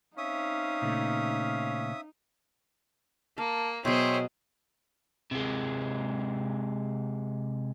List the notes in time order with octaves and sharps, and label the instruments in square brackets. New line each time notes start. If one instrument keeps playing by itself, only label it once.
[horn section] C4 C#4 F5 [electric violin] D#4 [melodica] E5 D#6
[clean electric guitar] A#2 C#3 A3
[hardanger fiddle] A#3 [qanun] F5 [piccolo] A5
[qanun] B2 F#3 [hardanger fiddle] G#4 C5 [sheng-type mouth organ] C#5 E5 G5 [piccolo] C6
[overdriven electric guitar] C3 G#3